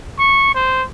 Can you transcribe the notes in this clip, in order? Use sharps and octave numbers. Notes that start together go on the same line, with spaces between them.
C#6
C5